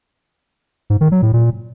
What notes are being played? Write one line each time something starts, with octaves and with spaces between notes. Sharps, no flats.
G#2
D#3
F#3
A2
A#2